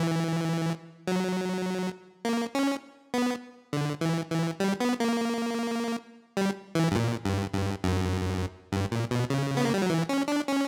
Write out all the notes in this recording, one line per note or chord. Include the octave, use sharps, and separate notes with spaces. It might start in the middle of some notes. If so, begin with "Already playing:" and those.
Already playing: E3
F#3
A#3
C#4
B3
D3
E3
E3
G3
B3
A#3
G3
E3
G2
A#2
G2
G2
F#2
G2
A#2
B2
C#3
B3
A#3
G3
F#3
E3
C#4
D4
C#4